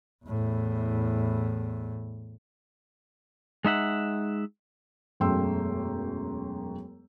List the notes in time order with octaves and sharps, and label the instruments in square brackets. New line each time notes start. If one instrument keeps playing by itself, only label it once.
[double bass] E2 A2
[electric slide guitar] G#3 D#4 E5 F#5
[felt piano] E1 F#2 A3 G5 C6 E6